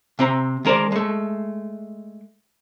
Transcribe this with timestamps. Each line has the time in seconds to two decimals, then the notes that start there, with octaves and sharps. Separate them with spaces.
0.19 C3 C4 A#5
0.65 D#3 G#3 A#4 C5 D5
0.92 G#3 A3